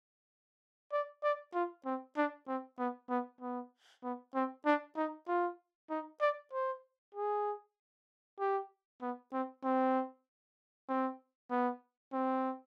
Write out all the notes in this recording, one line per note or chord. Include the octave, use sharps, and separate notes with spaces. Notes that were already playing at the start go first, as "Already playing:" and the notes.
D5
D5
F4
C4
D4
C4
B3
B3
B3
B3
C4
D4
D#4
F4
D#4
D5
C5
G#4
G4
B3
C4
C4
C4
B3
C4